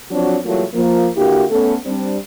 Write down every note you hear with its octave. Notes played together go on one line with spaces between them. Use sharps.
F3 F#3 C4 D4 F#4
E3 F#3 G3 A3 A#3 F4
F3 A#3
D3 A#3 E4 F#4 G4
A3 B3 C#4 A4
G3 C4 D4